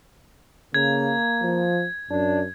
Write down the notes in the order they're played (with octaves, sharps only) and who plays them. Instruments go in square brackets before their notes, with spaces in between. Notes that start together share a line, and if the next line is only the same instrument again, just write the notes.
[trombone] C#3 [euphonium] A#3 [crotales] G#6
[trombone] F3
[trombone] F#2 [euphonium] D4